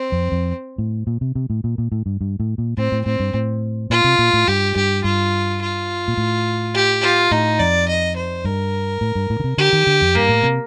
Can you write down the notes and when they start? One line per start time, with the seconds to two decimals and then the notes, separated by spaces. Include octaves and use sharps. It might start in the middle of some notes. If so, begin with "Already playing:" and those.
Already playing: C4
0.12 F2
0.32 F2
0.78 A2
1.07 A#2
1.21 C3
1.35 C3
1.50 A2
1.64 A#2
1.78 A#2
1.92 A2
2.06 G2
2.21 G2
2.40 A2
2.58 A#2
2.77 A2 C4
2.92 A2
3.06 A2 C4
3.20 G2
3.34 A2
3.90 A#2 F4
4.04 C3
4.19 A#2
4.33 A2
4.48 G2 G4
4.76 G2 G4
5.04 G2 F4
5.61 F4
6.08 A#2
6.17 A2
6.75 G4
7.03 F4
7.31 A2 D#4
7.59 F2 D5
7.88 D#5
8.16 C5
8.45 G2 A#4
9.01 A2
9.15 G2
9.30 A2
9.40 D3
9.44 C3
9.58 D3 G4
9.73 D#3
9.87 D3
10.01 F2
10.15 G2 A#3
10.29 A2
10.43 C3